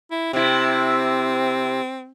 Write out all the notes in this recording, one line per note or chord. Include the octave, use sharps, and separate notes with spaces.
E4
C3 C4 E4